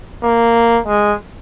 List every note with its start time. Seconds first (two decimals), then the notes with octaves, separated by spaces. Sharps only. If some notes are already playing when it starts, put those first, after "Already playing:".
0.23 A#3
0.86 G#3